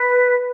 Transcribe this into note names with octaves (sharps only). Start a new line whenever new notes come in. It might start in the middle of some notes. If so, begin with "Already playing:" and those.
Already playing: B4